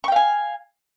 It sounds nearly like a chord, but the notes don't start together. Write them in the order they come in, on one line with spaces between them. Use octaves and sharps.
C#6 G5 F5 G#5